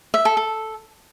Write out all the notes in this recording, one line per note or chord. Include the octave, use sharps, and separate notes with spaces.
E5
A4
A4